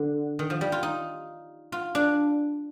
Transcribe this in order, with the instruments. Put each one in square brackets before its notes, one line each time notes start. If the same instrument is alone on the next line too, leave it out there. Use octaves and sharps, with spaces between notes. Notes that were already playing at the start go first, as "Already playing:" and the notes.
Already playing: [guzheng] D3
D#3
F3
G3
F4
D#4
F4
D4